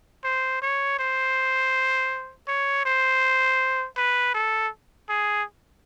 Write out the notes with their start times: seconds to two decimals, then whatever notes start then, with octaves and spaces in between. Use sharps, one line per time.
0.24 C5
0.62 C#5
0.99 C5
2.48 C#5
2.85 C5
3.97 B4
4.34 A4
5.09 G#4